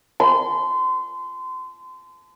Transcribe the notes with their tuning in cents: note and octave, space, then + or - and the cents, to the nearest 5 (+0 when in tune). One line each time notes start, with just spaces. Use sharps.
C6 -30